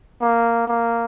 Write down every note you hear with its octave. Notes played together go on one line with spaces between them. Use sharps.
A#3
A#3